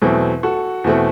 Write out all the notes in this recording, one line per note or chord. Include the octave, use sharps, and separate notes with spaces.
E2 B2 F#3 A3 C4
F#4 A4
E2 B2 A3 C4